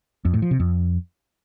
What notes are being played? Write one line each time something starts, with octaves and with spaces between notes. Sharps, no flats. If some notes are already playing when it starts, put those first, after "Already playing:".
F2
A2
F3
C3
F2